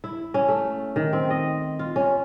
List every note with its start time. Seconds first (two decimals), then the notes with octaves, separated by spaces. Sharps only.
0.04 E4
0.34 C#4
0.48 A3
0.96 D#3
1.13 C4
1.30 D#5
1.79 F4
1.96 C#4